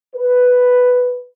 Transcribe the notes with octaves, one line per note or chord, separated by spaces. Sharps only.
B4